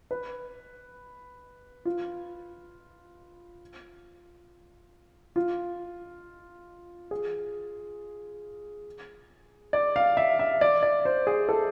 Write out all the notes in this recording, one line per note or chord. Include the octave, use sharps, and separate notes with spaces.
B4
F4
F4
G#4
D5
F5
E5
E5
D5
D5
C5
G#4
A4